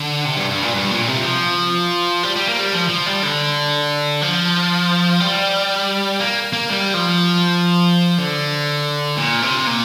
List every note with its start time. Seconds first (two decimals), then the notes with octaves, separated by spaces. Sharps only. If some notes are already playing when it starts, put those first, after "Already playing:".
Already playing: D3
0.25 C3
0.37 G2
0.50 G2
0.62 A#2
0.74 G2
0.91 A#2
1.08 C3
1.24 F3
2.23 G3
2.36 G3
2.49 A#3
2.60 G3
2.73 F3
2.89 F3
3.06 G3
3.23 D3
4.21 F3
5.20 G3
6.20 A#3
6.53 A#3
6.69 G3
6.94 F3
8.18 D3
9.17 A#2
9.42 C3
9.67 A#2